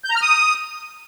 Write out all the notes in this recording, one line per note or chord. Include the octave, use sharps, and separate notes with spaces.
G6
A#5
F6
D#6